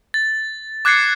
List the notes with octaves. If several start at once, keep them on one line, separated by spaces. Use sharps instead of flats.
A6
D6 F#6 G#6 A6 C7 C#7